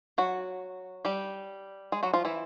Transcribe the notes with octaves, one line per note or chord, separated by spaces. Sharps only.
F#3 F#4
G3 G4
G#3 G#4
F#3 F#4
F3 F4
E3 E4